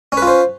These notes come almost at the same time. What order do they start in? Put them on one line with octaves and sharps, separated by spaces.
C#4 B4 F4 C5